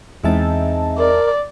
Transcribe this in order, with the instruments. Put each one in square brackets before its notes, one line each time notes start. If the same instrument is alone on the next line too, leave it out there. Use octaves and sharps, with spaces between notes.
[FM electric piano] E2 E5 A5 [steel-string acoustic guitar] G#3 C4 D#4
[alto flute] A#4 [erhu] D5